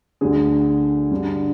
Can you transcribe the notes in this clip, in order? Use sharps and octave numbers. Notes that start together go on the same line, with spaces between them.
D2 D3 G#4
G2 D3